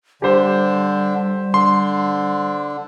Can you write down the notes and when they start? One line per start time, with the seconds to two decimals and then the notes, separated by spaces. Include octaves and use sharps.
0.22 D3 G3 G4 C5
1.54 D3 C6